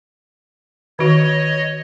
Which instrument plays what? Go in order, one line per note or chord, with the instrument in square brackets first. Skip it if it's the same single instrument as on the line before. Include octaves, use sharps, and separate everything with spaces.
[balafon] D#3 F#4 [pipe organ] C#5 D#5